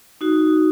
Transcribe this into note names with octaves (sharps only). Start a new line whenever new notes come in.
D#4 F#4